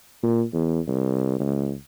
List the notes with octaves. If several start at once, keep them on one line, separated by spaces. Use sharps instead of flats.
A#2
E2
C2
C#2